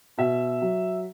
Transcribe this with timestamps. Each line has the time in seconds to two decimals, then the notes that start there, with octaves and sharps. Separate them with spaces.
0.18 B2 E5
0.62 F#3